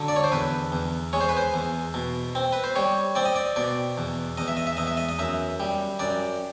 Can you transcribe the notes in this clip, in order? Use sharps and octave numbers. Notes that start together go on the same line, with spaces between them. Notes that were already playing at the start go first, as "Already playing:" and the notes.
Already playing: D3 F#3
D5
C#5
C5
E2 B4
E2
G#3 C#5
C5
B4
C5
E2
B2
C4
B4
C5
G3 C#5
C4 D5
D#5
D5
B2 D5
E2
E2 D#5
E5
D#5
E5
E2 D#5
E5
D#5
D#5
F#2 E5
G3
F#2 D5